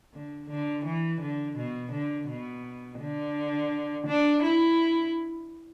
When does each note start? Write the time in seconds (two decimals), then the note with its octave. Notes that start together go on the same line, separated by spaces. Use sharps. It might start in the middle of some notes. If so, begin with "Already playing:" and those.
0.14 D3
0.50 D3
0.85 E3
1.21 D3
1.57 B2
1.93 D3
2.29 B2
3.00 D3
4.07 D4
4.43 E4